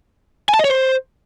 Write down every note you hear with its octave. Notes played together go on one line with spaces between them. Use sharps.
G#5
A5
D#5
C#5
C5